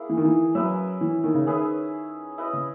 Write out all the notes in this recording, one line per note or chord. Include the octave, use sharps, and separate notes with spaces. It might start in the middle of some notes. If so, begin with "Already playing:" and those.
Already playing: A#3 E4 G#4
E3
D#3
E3
F#3 C#4 E4 B4 E5
E3
D#3
C#3
D#3 C#4 G#4 B4 E5
E4 B4 D#5
C#3